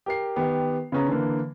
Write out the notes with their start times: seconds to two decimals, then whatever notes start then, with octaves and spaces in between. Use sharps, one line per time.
0.06 G4 A#4 C7
0.36 D#3 B3 G4
0.92 C#3 B3 C#4 G#4 A#5
1.08 D3 E3 A#3